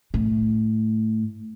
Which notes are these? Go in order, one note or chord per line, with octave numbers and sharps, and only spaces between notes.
A2